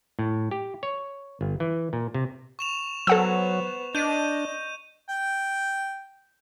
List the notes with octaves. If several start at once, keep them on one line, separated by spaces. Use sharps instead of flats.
A2
G4
C#5
G1
E3
A#2
C3
C#6 E7 F7
F#3 B3 A4 C5 F#5 E6
D4 D#5 G6 D#7
G5